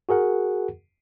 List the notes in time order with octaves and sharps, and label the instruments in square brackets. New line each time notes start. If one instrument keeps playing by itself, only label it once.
[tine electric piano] F#4 G#4 A#4 F#5